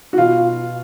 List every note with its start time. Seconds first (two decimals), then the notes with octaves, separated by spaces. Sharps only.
0.13 F#4
0.18 B2 F4